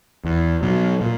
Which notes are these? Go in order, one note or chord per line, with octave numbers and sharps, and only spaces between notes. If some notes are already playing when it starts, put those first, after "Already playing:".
E2
B2 F#3
A#2